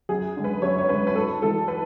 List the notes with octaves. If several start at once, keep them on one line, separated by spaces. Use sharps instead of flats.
F#2 G#4
D3 G#3
B4
F#2 C#5
C#5
D3 G#3 B4
B4
G#2 A4
E3 G#3 A4
B4